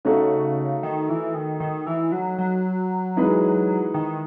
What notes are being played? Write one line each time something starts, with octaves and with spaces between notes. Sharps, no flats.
C#3 A3 D#4 F#4 A4
D#3
E3
D#3
D#3
E3
F#3
F#3
E3 G#3 D#4 G#4 B4
D#3